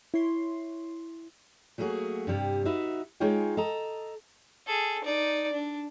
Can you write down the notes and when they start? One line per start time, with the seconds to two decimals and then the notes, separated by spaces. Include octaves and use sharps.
0.14 E4 C#5 C6
1.78 F#3 A3 A#3 F#4 G#4
2.27 G2 C3 G3
2.65 D#4 F#4 B4 E5
3.20 G#3 D#4 F4 G#4 C#5 G5
3.57 A4 D#5 A#5
4.67 G#4 A4
5.04 D#4 D5
5.53 D4